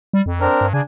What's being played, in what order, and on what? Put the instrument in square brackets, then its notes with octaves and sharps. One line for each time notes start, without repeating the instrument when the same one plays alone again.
[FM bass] G3
F2
[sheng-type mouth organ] C4 D4 A#4
[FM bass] G2
[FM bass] C#3 [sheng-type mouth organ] D4 G#5